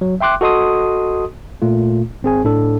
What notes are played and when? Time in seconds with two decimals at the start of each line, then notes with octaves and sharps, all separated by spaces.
0.01 F#3
0.21 E5 G5 C6 D6 F#6
0.41 F#4 A4 D#5 C6 D#6
1.62 A#2 A3 F4
2.23 G#1 C4 G#4 G#5
2.44 A2 D4 A4